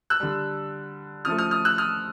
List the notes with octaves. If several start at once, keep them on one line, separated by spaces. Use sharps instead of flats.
E6 F#6
D3 G3
C#3 F3 A3 D#6 F6
D#6 F6
D#6 F6
E6 F#6
D#6 F6